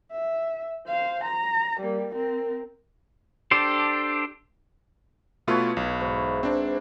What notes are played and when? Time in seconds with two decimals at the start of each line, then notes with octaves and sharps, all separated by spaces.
0.11 E5
0.88 C5 F5
1.24 A#5
1.81 G3 A#3
2.15 C4 A#4
3.51 D4 G4 A4 C5
5.47 B2 A3 E4 F4 B4 C#5
5.77 B1
6.01 G#2
6.43 C4 D4